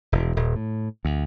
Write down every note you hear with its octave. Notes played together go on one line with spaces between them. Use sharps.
E1
D#1
A2
D2